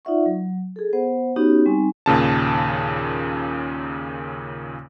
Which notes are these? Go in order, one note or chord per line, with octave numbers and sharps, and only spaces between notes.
D#4 F4 D5 E5 F#5 C#6
F#3
G#4 A4
B3 C5 F#5
B3 C#4 D#4 F#4 G4 C#5
G3 C4 D#4 G#5 C#6
D#2 A#2 C#3 A5